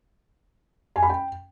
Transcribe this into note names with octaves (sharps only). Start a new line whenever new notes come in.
G#5
B5
G5